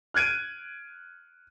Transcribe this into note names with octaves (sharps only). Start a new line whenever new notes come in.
F6 F#6 G#6 D7 D#7